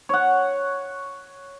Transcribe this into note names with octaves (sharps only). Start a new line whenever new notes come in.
C#5 F#5